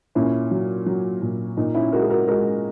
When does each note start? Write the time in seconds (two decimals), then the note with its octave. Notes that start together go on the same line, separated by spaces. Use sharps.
0.15 A#2 C#4 E4
0.51 F#3
0.86 F#3
1.22 A#2
1.57 A#2 D#4
1.74 C#4 E4
1.92 G#3 F#4 A#4
2.02 G#4
2.10 F#4 A#4
2.27 G#3 F#4 A#4